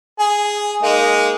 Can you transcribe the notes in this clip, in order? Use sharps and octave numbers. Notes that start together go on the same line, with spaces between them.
G#4
G#3 A#3 D#4